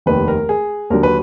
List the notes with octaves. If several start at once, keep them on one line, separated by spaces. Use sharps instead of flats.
F1 D#2 D#3 B4
A#4
G#4
D#2 D3 F#3 A#4
B4